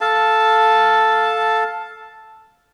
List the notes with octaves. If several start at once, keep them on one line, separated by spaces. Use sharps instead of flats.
A4 F5 A5